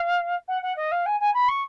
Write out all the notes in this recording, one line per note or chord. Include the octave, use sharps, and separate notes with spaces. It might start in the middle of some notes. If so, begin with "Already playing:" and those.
Already playing: F5
F#5
F#5
D#5
F5
G#5
G#5
B5
C#6